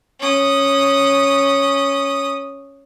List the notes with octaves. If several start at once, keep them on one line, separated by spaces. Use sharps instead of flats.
C#4 D#6